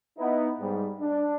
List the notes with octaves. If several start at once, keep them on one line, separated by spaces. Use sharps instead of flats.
B3 D#4 E4
G#2 G3
D4